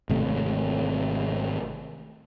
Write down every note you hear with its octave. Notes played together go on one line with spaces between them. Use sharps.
G#1 C3 A3